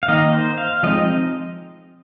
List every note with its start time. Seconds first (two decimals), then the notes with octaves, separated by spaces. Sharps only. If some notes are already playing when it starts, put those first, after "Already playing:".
0.03 F5
0.08 D#3 A#3 D#4 D#5
0.33 C5
0.58 F5
0.83 F3 G#3 C4 D#4 D#5